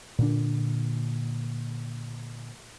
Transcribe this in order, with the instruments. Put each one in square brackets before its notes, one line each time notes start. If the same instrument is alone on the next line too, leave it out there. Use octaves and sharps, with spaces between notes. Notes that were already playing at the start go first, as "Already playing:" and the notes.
[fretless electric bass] A#2 D3 D4